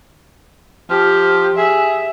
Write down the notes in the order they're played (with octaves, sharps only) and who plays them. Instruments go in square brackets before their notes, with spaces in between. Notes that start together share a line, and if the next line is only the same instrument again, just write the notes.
[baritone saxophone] F3 [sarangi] G4
[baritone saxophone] G#4 [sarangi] E5